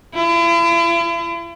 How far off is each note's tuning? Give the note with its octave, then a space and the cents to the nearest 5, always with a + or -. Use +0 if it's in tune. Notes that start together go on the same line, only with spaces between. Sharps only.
E4 +40